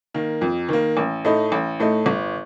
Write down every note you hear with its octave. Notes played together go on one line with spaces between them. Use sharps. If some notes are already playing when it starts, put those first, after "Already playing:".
D#3 A#3
F2
D#3 A#3
A1
A2 A3 D#4
A1
A2 A3 D#4
G1